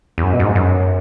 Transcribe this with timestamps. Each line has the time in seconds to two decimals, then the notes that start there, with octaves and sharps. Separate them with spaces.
0.18 E2
0.23 F#2
0.33 B2
0.40 F#2
0.44 G#2
0.55 F#2